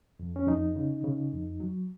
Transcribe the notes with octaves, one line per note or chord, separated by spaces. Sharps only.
F2
C#4
F2 D#4
C#3
C#3
F2
F#3